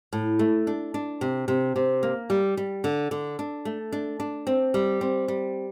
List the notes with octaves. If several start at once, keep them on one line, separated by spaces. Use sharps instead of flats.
A2
A3
D4
D4
C3
C3
C3
A#3
G3
G3
D3
D3
D4
A3
D4
D4
C4
G3
C4
G3